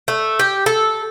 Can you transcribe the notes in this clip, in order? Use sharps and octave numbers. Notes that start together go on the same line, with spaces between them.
A3
G4
A4